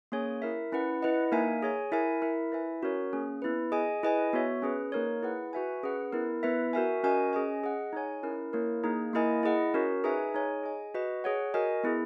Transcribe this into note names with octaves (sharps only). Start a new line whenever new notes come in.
A#3 C#4 G#4 C#5 G#5
E4 A#4 E5
C#4 E4 B4 F#5
E4 B4 D#5 F#5
A#3 D#4 A#4 E5 G#5
G#4 C#5 G#5
E4 A#4 E5 G#5
E4 A#4 E5
E4 B4 E5 G#5
C#4 F#4 A#4 C#5
A#3 C#4 G#4
B3 E4 B4
G#4 D#5 G#5
E4 G#4 B4 D#5 G#5
B3 F#4 C#5 E5
C#4 G#4 B4
A#3 D#4 A#4 C#5
E4 G#4 B4 F#5
F#4 B4 E5 G#5
C#4 G#4 B4 F#5
B3 E4 A#4
B3 E4 B4 E5
F#4 A#4 E5 G#5
C#4 F#4 A#4 D#5 G#5
C#4 G#4 D#5 G#5
G#4 D#5 F#5
D#4 G#4 C#5 G#5
C#4 E4 A#4
A#3 E4 A#4 C#5
A#3 D#4 G#4
A#3 E4 A#4 D#5 G#5
E4 G#4 D#5 F#5
C#4 F#4 A#4 C#5
D#4 G#4 B4 E5 G#5
D#4 G#4 C#5 G#5
G#4 D#5 G#5
F#4 B4 D#5
G#4 C#5 F#5
F#4 A#4 D#5 G#5
B3 E4 G#4